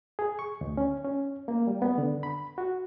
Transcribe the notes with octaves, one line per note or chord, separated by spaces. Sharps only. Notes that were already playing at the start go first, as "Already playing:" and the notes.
G#4
C#6
D2
C#4
C#4
A#3
G3
B3
D3
B5
F#4